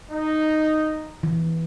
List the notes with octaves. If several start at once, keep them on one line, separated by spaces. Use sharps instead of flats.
D#4
E3